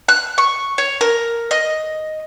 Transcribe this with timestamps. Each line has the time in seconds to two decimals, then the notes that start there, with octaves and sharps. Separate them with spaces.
0.08 F#6
0.38 C#6
0.78 C#5
1.01 A#4
1.51 D#5